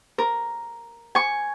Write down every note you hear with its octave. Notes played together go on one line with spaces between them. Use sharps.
A#4
G#5 C#6